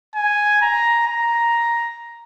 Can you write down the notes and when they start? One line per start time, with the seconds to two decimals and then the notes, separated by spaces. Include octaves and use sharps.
0.15 G#5
0.62 A#5
1.08 A#5